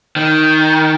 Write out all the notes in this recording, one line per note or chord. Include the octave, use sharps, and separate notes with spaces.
D#3